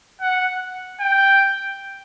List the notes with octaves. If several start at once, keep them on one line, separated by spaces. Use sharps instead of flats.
F#5
G5